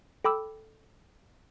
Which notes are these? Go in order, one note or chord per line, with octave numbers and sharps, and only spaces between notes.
A4 G5 B5 D6 E6